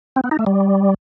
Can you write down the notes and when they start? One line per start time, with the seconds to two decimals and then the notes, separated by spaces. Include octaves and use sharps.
0.16 C4
0.24 B3
0.31 D#4
0.39 A3
0.46 G3